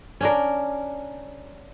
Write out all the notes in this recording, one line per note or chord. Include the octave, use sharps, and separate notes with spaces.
C#4 D4 A#4